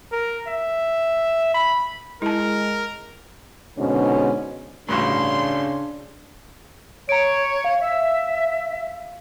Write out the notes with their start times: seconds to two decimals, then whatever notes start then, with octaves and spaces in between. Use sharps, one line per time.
0.12 A#4
0.47 E5
1.55 B5
2.22 G#3 E4 A#4 A5
3.77 G#2 B2 D3 C#4
4.89 A1 D2 G2 C#3 D4 C6
7.09 C#5 A#5 D7
7.64 F5
7.81 E5